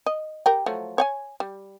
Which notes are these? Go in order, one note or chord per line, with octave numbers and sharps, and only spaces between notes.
D#5
G4 A#4 G5
F3 F#3 A3
C#5 G5 G#5
G3